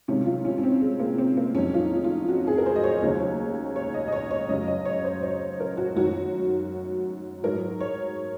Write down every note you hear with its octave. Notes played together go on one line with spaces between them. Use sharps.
C#2 C3 D#3 F#3 C#4
F4
C#4
C#4
C4
G#3
A#3
C4
A#3
F2 D#3 F#3 C#4
F4
D#4
F4
F#4
G#4
A#4
C5
D#5
C#5
D#2 C#3 F#3
C#5
D#5
D#5
C#5
C#5
F#2 C#3 F#3 D#5
D#5
C#5
C5
C#5
A#4
F#4
F#2 D#3 F#3 F#4
G#2 F#3 A#4
C#5